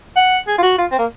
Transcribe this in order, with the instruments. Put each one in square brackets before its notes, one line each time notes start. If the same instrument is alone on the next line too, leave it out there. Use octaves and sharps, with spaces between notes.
[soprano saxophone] F#5
G#4
F4
F#4
F4
C4
A#3